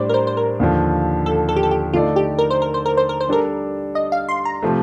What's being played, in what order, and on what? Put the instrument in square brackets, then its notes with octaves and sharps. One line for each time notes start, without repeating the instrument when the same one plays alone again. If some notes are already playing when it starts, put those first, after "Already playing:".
Already playing: [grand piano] A2 G3 D4 [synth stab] C5 D5
[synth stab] A#4
C5
C5
A#4
[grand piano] D#2 D3 F3
[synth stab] A4
A4
G4
A4
G4
[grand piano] D3 A3 D#4 A4 D5 [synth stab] F4
[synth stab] G4
A#4
C5
A#4
C5
A#4
C5
A#4
C5
[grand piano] G3 D4 A4 [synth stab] A#4
[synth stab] D#5
F5
C6
A#5
[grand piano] C3 F3 A3